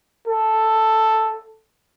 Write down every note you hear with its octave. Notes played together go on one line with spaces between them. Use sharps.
A4